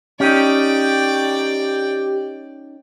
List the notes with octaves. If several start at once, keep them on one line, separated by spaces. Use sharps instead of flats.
C#4 D#4 G4 D5 G5